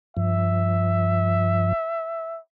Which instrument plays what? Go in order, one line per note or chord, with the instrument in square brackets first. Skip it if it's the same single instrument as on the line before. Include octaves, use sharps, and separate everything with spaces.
[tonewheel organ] G2 F3 [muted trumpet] E5